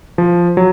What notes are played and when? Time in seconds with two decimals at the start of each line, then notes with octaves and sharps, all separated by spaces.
0.18 F3
0.57 F#3